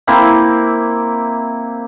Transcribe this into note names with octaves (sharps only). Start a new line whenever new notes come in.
A#3 C4 E4